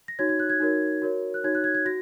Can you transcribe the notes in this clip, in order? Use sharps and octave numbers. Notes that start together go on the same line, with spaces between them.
A#6
D#4 F#4 C#5 G#6
G#6
F#6
G#6
D#4 F#4 A#4 C#5
F#4 A#4 C#5
F#6
D#4 F#4 C#5 G#6
F#6
G#6
G#6
F#4 A#6